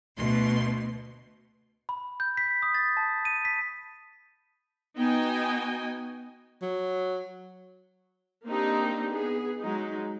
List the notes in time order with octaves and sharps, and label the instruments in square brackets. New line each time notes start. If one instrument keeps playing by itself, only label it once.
[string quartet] D2 C6 [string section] B2
[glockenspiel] B5
G6
B6
D#6
A6
A5
D#7
B6
[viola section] B3 D#4 F#4 D#5 G5 G#5
[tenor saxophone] F#3
[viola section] A#3 C4 D4 D#4 G4
B3 G#4
F#3 G#3 D#4